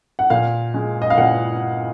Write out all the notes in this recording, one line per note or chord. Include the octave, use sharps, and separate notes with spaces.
F#5
A#2 F5
G#3
D#5
F5
A#2 F#5